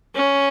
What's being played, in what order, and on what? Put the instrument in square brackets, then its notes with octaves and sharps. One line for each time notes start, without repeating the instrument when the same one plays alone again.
[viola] C#4